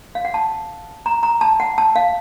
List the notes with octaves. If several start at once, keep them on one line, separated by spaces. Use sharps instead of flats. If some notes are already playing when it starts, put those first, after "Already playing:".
F5
F#5
A5
A#5
A#5
A5
F#5
A5
F5